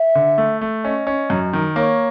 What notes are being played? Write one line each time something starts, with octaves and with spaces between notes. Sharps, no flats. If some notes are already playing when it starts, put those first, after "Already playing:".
Already playing: E5
D3
A3
A3
C#4 D#5
C#4
F#2
D#3
A#3 C#5